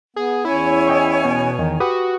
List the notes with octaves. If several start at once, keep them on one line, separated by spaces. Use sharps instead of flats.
B3 G#4
E2 C#4 E4 C#5 G#5
D#5 G5 C#6
B2
E2 D#3
F#4 G4 B4 D#6